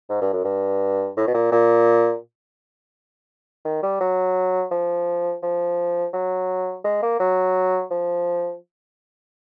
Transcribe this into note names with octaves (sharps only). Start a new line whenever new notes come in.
G#2
G2
F#2
G2
A2
B2
A#2
A#2
D#3
G3
F#3
F3
F3
F#3
G#3
A#3
F#3
F3